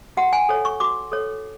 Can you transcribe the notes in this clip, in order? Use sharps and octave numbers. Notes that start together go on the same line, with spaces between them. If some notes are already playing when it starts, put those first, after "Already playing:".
F#4 F#5
G#5
A4 C#5
C#6
F#4 D6
A4 C#5